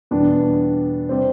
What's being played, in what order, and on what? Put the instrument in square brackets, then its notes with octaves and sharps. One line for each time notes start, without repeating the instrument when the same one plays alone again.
[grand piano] E2 B2 G3 B3 [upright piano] D4
[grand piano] C3 G3 [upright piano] C4